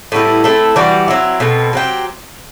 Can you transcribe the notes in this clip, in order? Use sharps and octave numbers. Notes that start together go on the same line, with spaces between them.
A2 G3 B3 E4
A3 C4 E4 A4
E3 G3 D4 F#4
F#3 C4 E4
B2 A3 C4
F#3 C4 G4